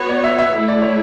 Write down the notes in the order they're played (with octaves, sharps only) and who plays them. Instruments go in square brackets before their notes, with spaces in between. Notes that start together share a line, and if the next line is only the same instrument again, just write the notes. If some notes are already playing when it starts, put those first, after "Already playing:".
Already playing: [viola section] B3 F#4 C#5 [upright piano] B4
[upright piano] D5
E5
E5
[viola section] A3 E4 A4 [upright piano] E5
[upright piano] D5
C#5